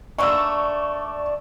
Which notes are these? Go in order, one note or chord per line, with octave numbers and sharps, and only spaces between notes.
D3 A3 A#3 D5 C#6 E6